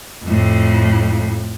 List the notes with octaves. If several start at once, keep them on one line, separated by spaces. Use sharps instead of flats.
F2 A2